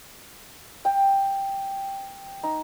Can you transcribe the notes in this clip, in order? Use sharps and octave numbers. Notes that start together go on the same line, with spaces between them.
G5
D#4